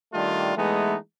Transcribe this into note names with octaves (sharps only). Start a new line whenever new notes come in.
D#3 G3 A3 D4 F4
E3 G#3 A3 B3 D#4